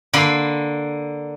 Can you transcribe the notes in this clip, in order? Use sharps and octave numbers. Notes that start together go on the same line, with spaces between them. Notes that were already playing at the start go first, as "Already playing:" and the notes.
D3 A#3 B5 C6